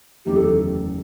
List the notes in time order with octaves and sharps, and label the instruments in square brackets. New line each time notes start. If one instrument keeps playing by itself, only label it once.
[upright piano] F#1 E2 D#3 A3 [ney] G4
[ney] A4